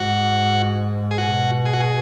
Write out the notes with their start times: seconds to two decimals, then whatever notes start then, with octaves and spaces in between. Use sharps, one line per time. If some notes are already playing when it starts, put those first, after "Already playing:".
Already playing: G#2 F#4
1.11 G#4
1.18 B2 F#4
1.66 G#4
1.73 F#4
1.80 G#4